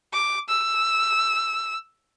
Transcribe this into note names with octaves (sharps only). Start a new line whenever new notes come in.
D6
E6